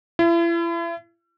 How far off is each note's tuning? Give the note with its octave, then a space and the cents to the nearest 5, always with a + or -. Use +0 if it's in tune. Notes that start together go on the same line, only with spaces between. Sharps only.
E4 +40